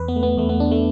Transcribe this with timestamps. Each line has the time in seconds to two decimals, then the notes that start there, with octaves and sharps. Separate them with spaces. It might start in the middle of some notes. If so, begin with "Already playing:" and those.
Already playing: E2 B4
0.08 B3
0.16 A3
0.23 B3
0.37 E2 A3
0.49 B3
0.60 E2 D4
0.71 A3